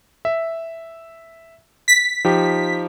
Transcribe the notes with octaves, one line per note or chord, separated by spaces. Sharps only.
E5
B6
F3 D#4 G4